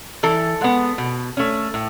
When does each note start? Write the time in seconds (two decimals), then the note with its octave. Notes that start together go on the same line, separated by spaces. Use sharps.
0.23 E3 A4
0.61 G#3 B3
0.98 B2
1.37 A3 C#4
1.74 A2